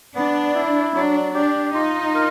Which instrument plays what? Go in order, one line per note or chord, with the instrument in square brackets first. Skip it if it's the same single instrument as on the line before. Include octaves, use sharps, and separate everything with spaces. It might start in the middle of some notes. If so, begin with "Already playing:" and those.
[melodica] B3 [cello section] D4
[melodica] E4
[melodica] F#3 [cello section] D4
[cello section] D4 [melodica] G4
[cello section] D#4 [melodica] F4
[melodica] A#4